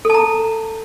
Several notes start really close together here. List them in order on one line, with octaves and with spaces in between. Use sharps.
A4 A5 A#5